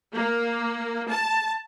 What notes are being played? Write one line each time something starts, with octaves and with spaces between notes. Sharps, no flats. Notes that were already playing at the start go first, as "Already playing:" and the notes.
A#3
A5